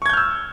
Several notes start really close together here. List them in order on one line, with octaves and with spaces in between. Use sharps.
C#6 G#6 G6 F6 E6